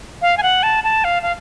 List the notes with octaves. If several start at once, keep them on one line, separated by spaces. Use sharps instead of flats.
F5
G#5
F#5
A5
A5
F5
F5